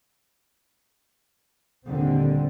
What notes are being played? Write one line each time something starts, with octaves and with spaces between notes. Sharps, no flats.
D#2 A#2 D3 G3 C4